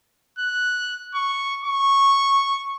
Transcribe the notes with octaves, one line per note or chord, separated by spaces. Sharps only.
F#6
C#6
C#6